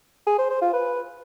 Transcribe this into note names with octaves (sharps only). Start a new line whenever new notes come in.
G#4
C5
C5
F4
B4